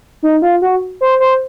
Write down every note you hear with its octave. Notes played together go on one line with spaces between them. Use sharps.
D#4
F4
F#4
C5
C5